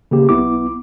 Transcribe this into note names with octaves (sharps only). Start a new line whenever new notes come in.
C#3 A#3 G4
B1 B3 E4 D6